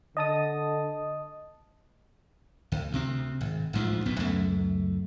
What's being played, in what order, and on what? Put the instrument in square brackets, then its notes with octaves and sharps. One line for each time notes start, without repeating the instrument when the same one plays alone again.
[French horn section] D3 [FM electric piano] D#5 A5 D#6
[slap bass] D2
D2 C3 C4
G#1
A1 D2 G#2 F3
D1 B1 F#2 B3
C#2 F#2 A3